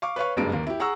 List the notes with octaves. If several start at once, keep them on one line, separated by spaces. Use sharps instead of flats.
F5 C#6 D6
B4 C#5 F5 C#6
F#1 G2 G#3 A#3 D7
D#2 A#3
E4 G4
G#4 F#5 A#5 C#6 E6